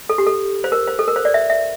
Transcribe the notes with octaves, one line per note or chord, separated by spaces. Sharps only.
A4
G4
A4
C5
A#4
C5
A4
A#4
C5
D5
E5
E5